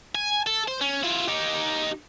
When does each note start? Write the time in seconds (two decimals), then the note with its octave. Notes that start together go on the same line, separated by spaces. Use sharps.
0.15 G#5
0.47 A4
0.68 C5
0.81 C#4
1.03 E4 F4
1.28 D#4 G4